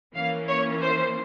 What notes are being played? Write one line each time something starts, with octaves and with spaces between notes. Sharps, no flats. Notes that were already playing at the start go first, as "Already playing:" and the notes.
E3 A#3 C#4 F5
C#5
C5